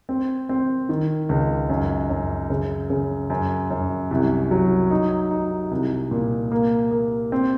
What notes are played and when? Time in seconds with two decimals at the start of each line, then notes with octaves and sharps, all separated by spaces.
0.09 C4
0.49 C4
0.89 D#3
1.29 C#2
1.70 F#2
2.09 F#2
2.50 C#3
2.90 C#3
3.30 F#2
3.71 F#2
4.11 C2
4.51 F#3
4.90 D#4
5.31 D#4
5.71 C2
6.11 A#2
6.52 A#3
6.91 A#3
7.32 C4